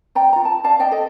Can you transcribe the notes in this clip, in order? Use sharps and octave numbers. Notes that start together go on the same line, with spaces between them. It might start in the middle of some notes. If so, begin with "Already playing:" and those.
D5 G5 A#5
F4 A#5
A5
D5 F5 A5
D5 D#5 G5
A4 D#5